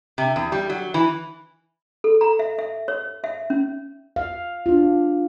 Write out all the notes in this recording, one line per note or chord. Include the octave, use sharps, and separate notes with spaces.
C3
E2
G3
F#3
E3
A4
A#5
E5
E5
C#5
E5
C#4
F5
D4 F4